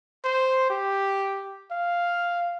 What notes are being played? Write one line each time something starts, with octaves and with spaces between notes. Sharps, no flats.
C5
G4
F5